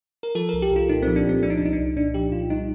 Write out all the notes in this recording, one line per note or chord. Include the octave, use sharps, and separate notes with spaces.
A#4
F3 A4
C2 A#4
G4
C2 F4
A#2 D#4
F3 C4
D4
C2 C4
F3 D4
D#4
D4
C2 D#4
D4
C2
A#2 D4
F3 G4
C2 F4
G3 D#4